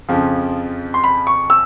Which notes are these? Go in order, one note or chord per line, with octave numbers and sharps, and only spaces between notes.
F2 C#3 F3
C6
B5
C#6
E6